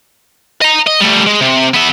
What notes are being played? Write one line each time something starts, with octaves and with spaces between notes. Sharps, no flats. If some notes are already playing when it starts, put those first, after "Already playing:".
D#5 A#5
D#5
G3 A3
G#3
C3
B3 E5